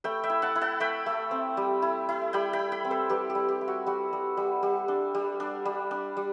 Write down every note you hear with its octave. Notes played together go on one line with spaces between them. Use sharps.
A3 G5 B5
E5 G5
E4
F#5 A5
E4
F#5 A5
A3 G5 B5
A3
C4
G3
E4
E4
G3 G5 B5
G5 B5
E4
G5 B5
C4
A4 C5
G3 G4 B4
G4
G3
G4
E4
F#4
G3 F#4
G3
G3
G3
D4
G3
D4
G3
D4
G3